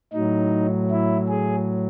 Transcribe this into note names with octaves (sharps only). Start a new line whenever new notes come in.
A2 F#3 D#4
E4
G#4